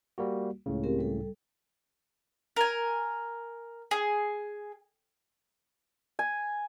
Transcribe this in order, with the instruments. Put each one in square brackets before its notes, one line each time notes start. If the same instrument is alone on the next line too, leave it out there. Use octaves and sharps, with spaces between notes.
[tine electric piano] G3 A#3 F#4
C#2 A2 C#3
[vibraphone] C4 G4 A#4
G3 A4
[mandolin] A#4 G#5
G#4
[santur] G#5